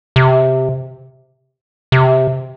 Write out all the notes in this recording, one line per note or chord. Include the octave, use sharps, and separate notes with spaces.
C3
C3